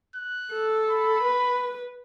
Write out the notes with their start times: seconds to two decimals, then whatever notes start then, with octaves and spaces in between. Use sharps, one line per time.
0.15 F#6
0.53 A4
0.90 B5
1.24 B4